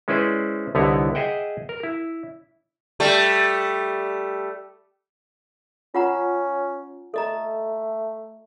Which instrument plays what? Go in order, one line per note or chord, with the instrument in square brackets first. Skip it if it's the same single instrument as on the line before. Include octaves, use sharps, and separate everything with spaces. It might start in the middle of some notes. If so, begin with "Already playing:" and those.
[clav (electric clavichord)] G#3 C#4 E4 B4 C5 D5
C2 D3 B3 D#4 E4 C#5
G#4 D#5 E5 F#5 G5
A#4
E4
[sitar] G3 A3
[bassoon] C#4 [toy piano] F4 F#5 A#5
[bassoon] A3 [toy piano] A4 D#5 A#5